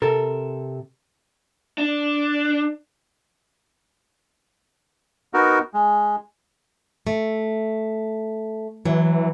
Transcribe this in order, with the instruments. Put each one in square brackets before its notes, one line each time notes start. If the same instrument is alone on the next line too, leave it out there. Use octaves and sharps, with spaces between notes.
[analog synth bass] C3 [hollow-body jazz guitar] A4 A#4
[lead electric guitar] D4
[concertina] B3 D#4 F#4 A#4
G#3
[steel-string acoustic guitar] A3
[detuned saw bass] E3 [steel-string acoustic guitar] F#3